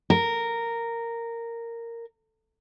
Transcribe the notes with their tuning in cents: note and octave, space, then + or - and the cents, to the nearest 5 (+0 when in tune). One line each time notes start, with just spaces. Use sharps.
A#4 -10